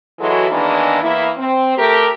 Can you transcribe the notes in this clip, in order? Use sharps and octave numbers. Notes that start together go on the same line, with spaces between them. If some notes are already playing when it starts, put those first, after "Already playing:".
E3 F#3 G#3 E4 F#4 A4
E2 D#3 E3 G#3 A#3 D4
E2 A#3 E4
C4
A3 G4 A#4